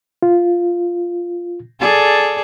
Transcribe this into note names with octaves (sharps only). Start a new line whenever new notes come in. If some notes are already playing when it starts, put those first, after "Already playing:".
F4
G#4 A4 D5